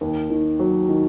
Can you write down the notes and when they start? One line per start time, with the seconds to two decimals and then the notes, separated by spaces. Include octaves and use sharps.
0.01 D#2
0.30 D#3
0.59 F#3
0.89 D#3